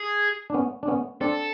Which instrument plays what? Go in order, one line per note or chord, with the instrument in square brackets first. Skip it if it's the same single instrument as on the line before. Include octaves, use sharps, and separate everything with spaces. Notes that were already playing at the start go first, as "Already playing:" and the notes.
Already playing: [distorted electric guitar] G#4
[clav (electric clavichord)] D4
B3 C#4
D4
B3 C#4
[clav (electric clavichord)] C4 D4 [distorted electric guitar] A4